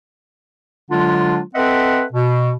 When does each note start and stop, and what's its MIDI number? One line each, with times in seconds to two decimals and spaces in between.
0.91 1.40 50
0.91 1.40 54
0.91 1.40 56
0.91 1.40 62
0.91 1.40 65
1.55 2.03 60
1.55 2.03 69
1.55 2.03 71
1.55 2.03 75
1.55 2.03 76
1.55 2.03 78
2.13 2.51 47